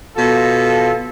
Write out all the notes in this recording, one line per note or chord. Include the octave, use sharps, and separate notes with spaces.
B2 F4 A4